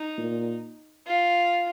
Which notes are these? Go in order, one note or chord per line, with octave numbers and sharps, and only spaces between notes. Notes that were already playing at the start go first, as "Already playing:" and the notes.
Already playing: D#4
A#2
F4